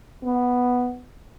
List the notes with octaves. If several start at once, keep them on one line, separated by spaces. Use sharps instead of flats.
B3